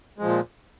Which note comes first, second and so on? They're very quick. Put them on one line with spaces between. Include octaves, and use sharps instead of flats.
G#3 F3 A#2